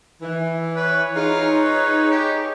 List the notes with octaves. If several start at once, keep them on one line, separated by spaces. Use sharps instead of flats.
E3
B4 C#5
D#4 F4 G#4
B4
G4